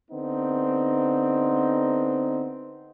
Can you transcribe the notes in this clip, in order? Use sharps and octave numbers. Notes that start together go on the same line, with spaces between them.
D3 B3 C4 D#4